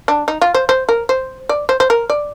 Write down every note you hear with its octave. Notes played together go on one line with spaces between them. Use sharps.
D4
D#4
F4
C5
C5
A#4
C5
D5
C5
C5
A#4
D5